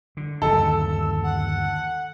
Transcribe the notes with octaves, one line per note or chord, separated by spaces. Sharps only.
D3
G1 D#2 C#3 A4 E6
F#5